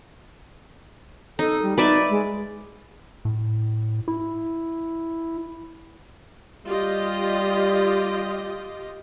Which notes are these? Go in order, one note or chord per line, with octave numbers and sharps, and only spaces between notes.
D#4 A4
G3
D#4 B4 D5 E5
G#3
A2
E4
G3 F4 G4 D#5